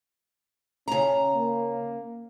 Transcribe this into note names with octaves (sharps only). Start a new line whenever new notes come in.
C#3 C#4 A#5
A#3